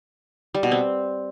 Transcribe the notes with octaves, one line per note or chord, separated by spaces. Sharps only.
G3
B2
C4